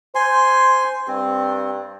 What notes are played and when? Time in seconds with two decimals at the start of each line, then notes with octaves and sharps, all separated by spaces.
0.15 C5 G#5 C6
1.08 G2 C4